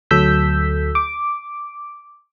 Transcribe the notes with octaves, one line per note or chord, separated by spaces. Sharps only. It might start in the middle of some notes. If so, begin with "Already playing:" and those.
D2 F#3 A4 E6 G6 B6
D6